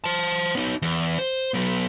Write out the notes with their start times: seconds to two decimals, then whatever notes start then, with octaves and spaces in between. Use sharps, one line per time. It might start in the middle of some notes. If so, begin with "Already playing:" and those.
0.04 C5 A5
0.55 B3 D#4
0.82 E2
1.19 C5
1.54 F#3 B3